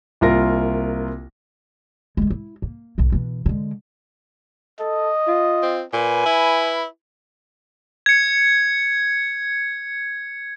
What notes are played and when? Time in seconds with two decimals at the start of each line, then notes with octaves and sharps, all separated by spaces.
0.21 C2 A#3 F4 A#4 A#6
2.17 D3 G#3
2.30 E4
2.62 A#3
2.98 B1 A2
3.12 B2 E3
3.46 D3 G#3
4.80 A4 D#5
5.28 F4
5.63 C4
5.93 A#2 B4 G#5
6.25 E4
8.06 G#6 C#7